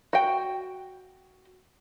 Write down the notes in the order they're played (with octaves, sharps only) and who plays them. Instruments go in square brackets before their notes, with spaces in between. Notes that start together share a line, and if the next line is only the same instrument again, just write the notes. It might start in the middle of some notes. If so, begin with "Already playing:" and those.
[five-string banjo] F#4 G5